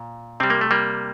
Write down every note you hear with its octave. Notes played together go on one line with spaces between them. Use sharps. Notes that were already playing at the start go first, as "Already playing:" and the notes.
Already playing: A#2
C3 G3 C4
A#3
A3
G3 A#3